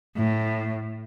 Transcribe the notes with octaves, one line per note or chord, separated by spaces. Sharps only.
A2